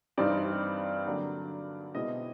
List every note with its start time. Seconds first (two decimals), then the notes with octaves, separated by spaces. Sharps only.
0.17 G2 E3 G3 C4 D#4 D5
1.05 D3 F#3 A#3 D4
1.95 B2 G#3 C4 E4 D#5